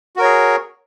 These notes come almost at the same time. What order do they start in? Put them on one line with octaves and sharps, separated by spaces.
F#4 A#4 C#5 G#4